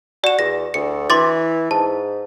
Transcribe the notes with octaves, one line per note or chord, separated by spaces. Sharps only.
F#4 D5 E7
E2 A#6
D2 C#7
E3 C6 D6 A6
G#2 A5